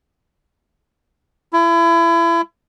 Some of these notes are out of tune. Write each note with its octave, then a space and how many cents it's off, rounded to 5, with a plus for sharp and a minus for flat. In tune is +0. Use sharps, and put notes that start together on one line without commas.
E4 +30